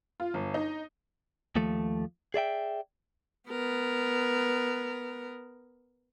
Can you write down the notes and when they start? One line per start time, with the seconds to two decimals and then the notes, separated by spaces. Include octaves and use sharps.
0.20 F4
0.34 G1
0.54 D#4
1.56 D#2 F3 A3
2.34 G#4 D5 E5 G5
3.49 B3 A#4